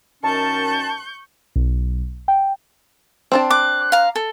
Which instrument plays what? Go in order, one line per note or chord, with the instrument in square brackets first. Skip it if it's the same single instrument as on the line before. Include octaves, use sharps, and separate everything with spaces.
[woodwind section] F#2 D#3 C#4 [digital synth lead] A5 [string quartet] C#6 G6
[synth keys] B1
G5
[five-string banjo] C4 D4 A5
[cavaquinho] D6 [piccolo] F#6
[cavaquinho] F5 A#5
A4